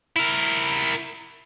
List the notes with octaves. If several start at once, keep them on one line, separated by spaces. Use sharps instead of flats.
E4 A#4